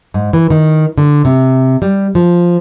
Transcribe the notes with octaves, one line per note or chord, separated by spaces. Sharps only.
G#2
E3
D#3
D3
C3
G3
F3